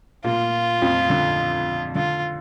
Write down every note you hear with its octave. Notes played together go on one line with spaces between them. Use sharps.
A#2 A#3 F4
F2 F3
D3
D3 F4